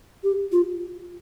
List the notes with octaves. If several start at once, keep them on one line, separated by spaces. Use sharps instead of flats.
G4
F4